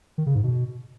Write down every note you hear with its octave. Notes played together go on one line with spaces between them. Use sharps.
D#3
C#3
G#2
B2